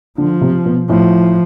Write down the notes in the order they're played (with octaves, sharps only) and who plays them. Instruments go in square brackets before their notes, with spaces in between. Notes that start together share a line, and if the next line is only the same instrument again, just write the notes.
[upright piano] D3 [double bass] F3
[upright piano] C3
B2
[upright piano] A2 [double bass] F3